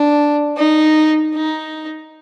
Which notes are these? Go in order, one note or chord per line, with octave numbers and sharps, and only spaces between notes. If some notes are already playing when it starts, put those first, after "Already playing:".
Already playing: D4
D#4
D#4